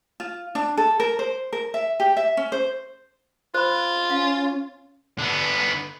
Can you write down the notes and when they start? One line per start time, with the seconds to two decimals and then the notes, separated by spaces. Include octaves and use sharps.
0.20 F4
0.55 D4
0.77 A4
1.00 A#4
1.19 C5
1.53 A#4
1.74 E5
2.00 G4
2.17 E5
2.37 C#4
2.52 C5
3.54 F4 C5 B5
4.10 C#4 F5
5.19 D3 B3